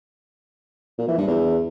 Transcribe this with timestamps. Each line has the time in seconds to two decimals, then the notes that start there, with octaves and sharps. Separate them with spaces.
0.98 A#2
1.08 E3
1.17 G2
1.27 E2